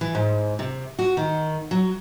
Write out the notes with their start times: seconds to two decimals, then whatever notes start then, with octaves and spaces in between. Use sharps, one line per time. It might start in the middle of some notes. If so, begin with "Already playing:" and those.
0.01 E3
0.15 G#2
0.59 C3
0.99 F#4
1.17 D#3
1.71 F#3